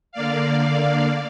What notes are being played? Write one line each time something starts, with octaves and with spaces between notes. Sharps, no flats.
D3 A#3 D5 F5